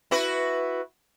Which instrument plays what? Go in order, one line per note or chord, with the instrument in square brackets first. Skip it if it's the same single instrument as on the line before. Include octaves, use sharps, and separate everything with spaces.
[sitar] E4 F#4 B4